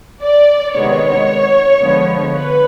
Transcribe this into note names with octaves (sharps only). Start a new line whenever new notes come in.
D5
C3 D#3 G#3 B3 C#5
D3 F3 G#3 B3
B4